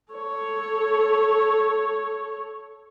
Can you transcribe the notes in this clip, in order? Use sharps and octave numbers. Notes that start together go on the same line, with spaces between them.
A4 C#5